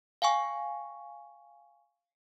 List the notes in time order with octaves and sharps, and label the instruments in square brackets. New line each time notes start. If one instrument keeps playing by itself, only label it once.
[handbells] F5 G5 G#5 C#6